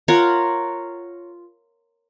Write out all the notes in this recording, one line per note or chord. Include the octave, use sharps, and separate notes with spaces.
F4 A#4 C#5 F#5